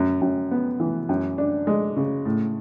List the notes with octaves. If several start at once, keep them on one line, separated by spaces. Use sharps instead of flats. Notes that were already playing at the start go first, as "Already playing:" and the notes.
Already playing: F#2
F#2
B3
E3
F#2
D4
G#3
C#3
A2